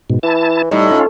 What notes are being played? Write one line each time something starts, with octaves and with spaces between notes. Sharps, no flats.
G#2 B2
E3 E4 A5
A2 G3 D#4
C#4 F4